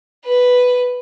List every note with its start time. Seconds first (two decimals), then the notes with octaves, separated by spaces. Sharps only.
0.25 B4